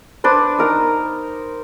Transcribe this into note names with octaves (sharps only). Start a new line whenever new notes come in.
D4 B4 C5
D#4 A#4 A#5